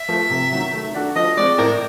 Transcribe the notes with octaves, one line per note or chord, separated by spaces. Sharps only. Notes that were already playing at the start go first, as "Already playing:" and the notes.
Already playing: E5
F3 A3
C3
D#3 F#3
A3
D4 F#4 A4
F3 D#5
G#3 C4 D5
A2 A#4